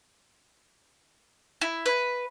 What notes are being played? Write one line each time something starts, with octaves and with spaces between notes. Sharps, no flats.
E4
B4